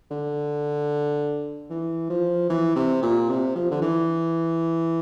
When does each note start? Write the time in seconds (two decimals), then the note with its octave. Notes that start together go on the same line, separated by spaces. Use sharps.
0.11 D3
1.70 E3
2.10 F3
2.49 E3
2.76 C3
3.03 A#2
3.29 C3
3.55 F3
3.71 D3
3.82 E3